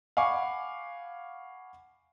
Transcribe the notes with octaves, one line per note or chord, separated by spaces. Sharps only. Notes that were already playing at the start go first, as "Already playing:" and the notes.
F5 F#5 G#5 B5 C#6 D6